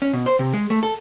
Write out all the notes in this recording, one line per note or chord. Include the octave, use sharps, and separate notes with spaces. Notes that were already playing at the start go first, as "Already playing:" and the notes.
C#4
B2
C5
C3
G#3
A3
A4